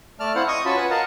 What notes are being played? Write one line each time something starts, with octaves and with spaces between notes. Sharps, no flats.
A3 D5 A5 F6
C4 E4 C5 F5 F#5
D#5 C#6 D#6
C#4 F4 F#4 A5 B5
B4 F#5 G#5
A#4 D#5 F5 F#5 A5